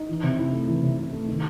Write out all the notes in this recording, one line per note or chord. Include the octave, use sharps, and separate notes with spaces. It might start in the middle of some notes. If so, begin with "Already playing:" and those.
Already playing: D#4
E3
C3
E4
A3
E3
C3
E4
A3
D#3